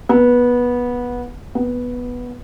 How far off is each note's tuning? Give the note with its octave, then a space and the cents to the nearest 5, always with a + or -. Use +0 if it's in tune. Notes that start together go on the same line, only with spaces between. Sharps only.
B3 -15
B3 -5